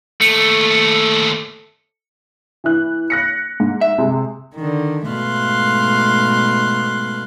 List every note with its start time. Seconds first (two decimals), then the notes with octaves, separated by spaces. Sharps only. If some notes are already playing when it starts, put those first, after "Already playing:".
0.22 D#2 A3 A4 C#7
2.64 E3 E4 F#6
3.10 F#6 A#6 C#7
3.60 G#2
3.81 E5
3.98 C3 G#3
4.56 D3 D#3
5.10 G#2 B2 A3 F5 C6 F#6